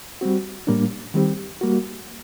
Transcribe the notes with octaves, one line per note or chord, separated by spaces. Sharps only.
G3 C4 F#4
A2 G3 A#3 D4
D#3 G3 C4 G4
G3 A#3 F#4